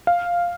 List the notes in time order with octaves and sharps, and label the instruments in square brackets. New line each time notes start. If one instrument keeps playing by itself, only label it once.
[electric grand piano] F5